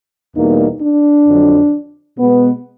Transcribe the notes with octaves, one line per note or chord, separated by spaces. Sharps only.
E2 B2 G3 A#3 D#4
D4
F2 D3 F#3
B2 G#3 B3